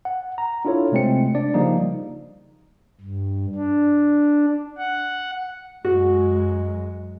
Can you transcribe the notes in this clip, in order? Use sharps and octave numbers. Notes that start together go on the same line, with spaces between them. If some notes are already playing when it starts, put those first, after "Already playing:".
F#5
A#5
D4 E4 F4 A4 C#5
C3 G#3 A3 C4 C#7
D4 D5
C#3 F3 G3 A#3 D#4
G2
D4
F#5
F#2 G#3 F#4